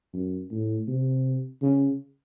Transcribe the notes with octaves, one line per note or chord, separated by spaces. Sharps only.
F#2
A2
C3
C#3